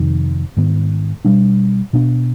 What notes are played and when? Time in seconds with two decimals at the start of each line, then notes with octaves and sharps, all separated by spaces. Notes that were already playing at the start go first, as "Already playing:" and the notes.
Already playing: F2 C3 D#3
0.57 G#2 D#3 B3
1.25 B2 G3 D4
1.93 B2 B3 D4